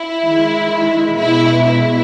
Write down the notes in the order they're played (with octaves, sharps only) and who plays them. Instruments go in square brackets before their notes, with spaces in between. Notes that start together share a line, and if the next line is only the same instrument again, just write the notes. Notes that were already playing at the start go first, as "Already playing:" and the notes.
Already playing: [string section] E4
D#3 G#3
B2 G#3 E4
E4